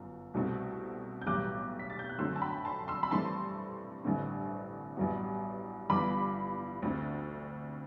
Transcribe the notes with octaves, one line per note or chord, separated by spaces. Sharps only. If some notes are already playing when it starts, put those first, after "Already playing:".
Already playing: G1 F#2
C2 B2 A3 C4
G6
B1 A2 E3 G3 D6 F#6
B6
A6
G6
F#6
F#2 D3 F#3 A3 C4 C6 E6
A5
G5 B5
A5 C6
C6 E6
B5
G2 E3 A3 C4 A5 C6
A1 G2 D3 A3 C4
A1 G2 F#3 B3
G1 G2 E3 B3 B5 D6
D2 D3 A3 C4